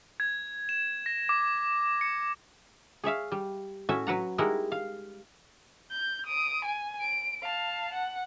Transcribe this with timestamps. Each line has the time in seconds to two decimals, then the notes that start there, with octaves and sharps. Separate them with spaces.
0.20 G#6
0.69 E7
1.06 A#6
1.29 D6
2.01 C#7
3.04 G#4 C#5 E5 F5
3.32 G3
3.89 A2 C#4 F#4 E5 G#5
4.07 F#3 B4 F#5 A#5
4.38 G3 G#3 D#4 E4 A#4 F#5
4.72 F5
5.91 G6
6.26 D#6 D7
6.65 G#5
7.00 D7
7.43 F5 A5
7.94 F#5